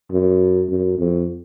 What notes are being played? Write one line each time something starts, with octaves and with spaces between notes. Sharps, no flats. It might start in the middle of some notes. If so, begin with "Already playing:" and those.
F#2
F#2
F2